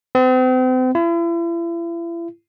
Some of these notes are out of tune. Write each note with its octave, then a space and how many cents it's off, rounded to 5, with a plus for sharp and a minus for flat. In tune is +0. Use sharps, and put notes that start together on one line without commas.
C4 -40
E4 +40